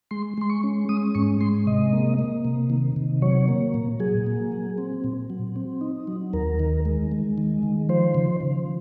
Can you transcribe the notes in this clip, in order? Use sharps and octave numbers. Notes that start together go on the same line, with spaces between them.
G#3 C6
G#3 C6
C#6
C#4
G#3 D#6
G#2 C#6
G#3 C6
C3 D#5
A#3
A#3
C3
D#3
C3
F#3 C#5
A#3
A#2
F#3 G#4
A#3
F#3
C4
A#2
F#3
C4
D#4
F#3
D#2 A#4
D#3
G#3
G#3
D#3
D#3
F3 C5
C#3
F3